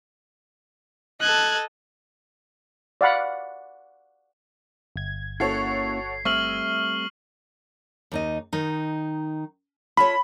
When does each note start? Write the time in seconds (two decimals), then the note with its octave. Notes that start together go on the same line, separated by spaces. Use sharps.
1.21 A4 D#5 F#6 G#6
3.01 D5 F5 F#5 B5
4.96 G1 G#6
5.40 A#3 C#4 E4 F#4 A4 C#5 C7
6.25 G3 A3 C4 E5 C#6 F6 F#7
8.12 D#2 D#4 D#5
8.53 D#3 D#4
9.97 F4 A4 C#5 B5